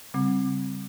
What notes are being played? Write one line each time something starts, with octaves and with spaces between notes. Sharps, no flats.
C#3 G3 C4